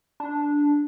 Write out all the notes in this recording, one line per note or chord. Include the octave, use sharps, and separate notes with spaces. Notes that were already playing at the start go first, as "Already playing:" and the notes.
D4